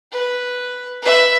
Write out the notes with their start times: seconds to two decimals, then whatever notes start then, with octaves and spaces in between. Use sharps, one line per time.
0.12 B4
1.02 B4 E5